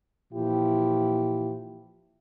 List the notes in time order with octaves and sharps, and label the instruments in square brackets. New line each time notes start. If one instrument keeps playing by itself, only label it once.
[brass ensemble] A#2 E3 F3 E4 G4